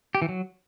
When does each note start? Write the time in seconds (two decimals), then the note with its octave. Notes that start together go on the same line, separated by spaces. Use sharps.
0.15 G4
0.22 E3
0.29 F#3